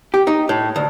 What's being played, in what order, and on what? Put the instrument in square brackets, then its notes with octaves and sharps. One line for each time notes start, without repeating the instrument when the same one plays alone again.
[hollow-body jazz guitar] G4
D#4
A2
D2